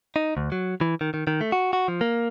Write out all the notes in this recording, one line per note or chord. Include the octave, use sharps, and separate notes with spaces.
D#4
D2
F#3
E3
D#3
D#3
D#3
A3
F#4
F#4
F3
A#3